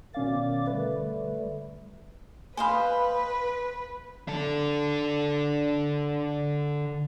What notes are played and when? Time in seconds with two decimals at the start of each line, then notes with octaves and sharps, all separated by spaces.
0.14 B2 D#3 C#4 D5 F5 D6
0.67 D3 G3 A3 B4
2.57 B4 C5 D#5 F5 G#5 B5
4.28 D3 A4